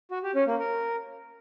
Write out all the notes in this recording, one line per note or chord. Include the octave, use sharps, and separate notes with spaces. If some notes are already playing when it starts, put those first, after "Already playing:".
F#4
G4
C#4
A#3
A#4